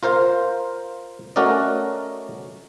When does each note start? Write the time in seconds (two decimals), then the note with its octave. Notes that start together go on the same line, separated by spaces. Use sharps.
0.03 F4 A#4 C5 F5
1.36 A3 C#4 F#4 A#4 D5 D#5